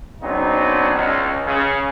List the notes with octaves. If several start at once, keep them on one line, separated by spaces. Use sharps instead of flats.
C#3 F#3 B3 C4 D4 D#4
C#2
C#3